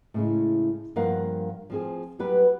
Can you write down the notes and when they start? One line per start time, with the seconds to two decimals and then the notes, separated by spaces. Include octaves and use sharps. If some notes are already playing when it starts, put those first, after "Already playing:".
0.14 A2 C#3 G#3
0.96 G2 F3 A#3 A#4 F5 F#5
1.70 F3 C4 G#4
2.19 F#3 G3 B3 G4 B4